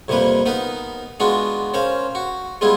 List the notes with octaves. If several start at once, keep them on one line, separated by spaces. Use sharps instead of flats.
F2 C3 G3 A#3 B4
B3 D#4 A#4 B4
G#3 B3 D4 F4 F#4
C#4 A#4 C5 F5
F#4
G3 G#3 B3 E4 F4 G#4